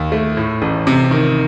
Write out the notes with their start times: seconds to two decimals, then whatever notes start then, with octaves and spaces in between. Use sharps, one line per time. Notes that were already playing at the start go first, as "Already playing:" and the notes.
Already playing: D#2
0.12 A3
0.37 A2
0.62 A1
0.87 C3
1.11 D#3